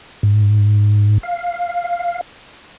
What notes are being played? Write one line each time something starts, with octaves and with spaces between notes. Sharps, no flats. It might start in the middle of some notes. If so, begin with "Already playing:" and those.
G#2
F5